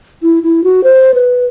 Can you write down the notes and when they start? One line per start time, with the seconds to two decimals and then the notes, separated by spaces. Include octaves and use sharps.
0.22 E4
0.43 E4
0.64 F#4
0.84 C5
1.14 B4